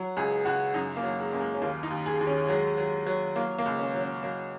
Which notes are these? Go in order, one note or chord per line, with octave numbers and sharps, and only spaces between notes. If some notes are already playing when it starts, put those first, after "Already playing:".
Already playing: F#3
C#2 G#4
C#2 F#4
F#2 D#4
A#3
F#3
G#3
F#2 A#3
G#3
C#4
D#2 A#3
D#4
D#2
G#4
D#2
C#4
F#3 G#3
F#3
F#3
F#3 A#3
A#3
C#2
C#4
F#3
C#4
F#3 A#3